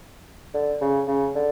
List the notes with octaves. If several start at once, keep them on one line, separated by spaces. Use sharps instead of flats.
D3
C#3
C#3
D3